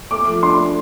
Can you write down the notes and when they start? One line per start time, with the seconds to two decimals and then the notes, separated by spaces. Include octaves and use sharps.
0.11 A3 D6
0.27 F3
0.42 D4 C6
0.59 A3